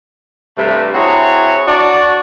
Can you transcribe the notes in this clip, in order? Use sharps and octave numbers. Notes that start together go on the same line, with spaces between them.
G2 C3 A3
C4 E4 F#4 G#4 C#5 A#5
D4 F#4 D5